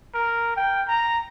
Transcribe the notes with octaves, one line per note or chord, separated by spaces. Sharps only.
A#4
G5
A#5